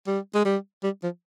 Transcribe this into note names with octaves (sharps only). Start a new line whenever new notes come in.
G3
G#3
G3
G3
F3